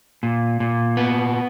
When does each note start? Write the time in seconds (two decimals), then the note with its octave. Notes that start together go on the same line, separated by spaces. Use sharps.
0.23 A#2
0.60 A#2
0.97 B3